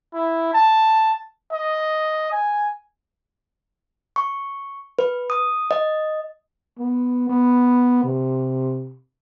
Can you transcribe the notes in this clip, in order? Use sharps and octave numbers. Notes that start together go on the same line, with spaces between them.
E4
A5
D#5
G#5
C#6
B4
D#6
D#5
B3
B3
C3